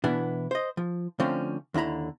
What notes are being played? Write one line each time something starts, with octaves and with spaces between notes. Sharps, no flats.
B2 E3 B3 D4 E4
C5 D#5
F3
D3 F3 A3 C4 C#4
D#2 D3 E4 A#5 B5